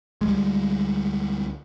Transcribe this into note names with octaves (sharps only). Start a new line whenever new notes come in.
D2 G3 G#3